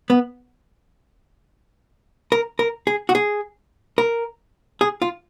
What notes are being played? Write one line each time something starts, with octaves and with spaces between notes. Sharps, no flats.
B3
A#4
A#4
G#4
F#4
G#4
A#4
G#4
F4